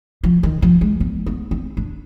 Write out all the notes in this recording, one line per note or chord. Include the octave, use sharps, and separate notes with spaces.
F3
D#3
F3
G#3
B3
B3
C4
D4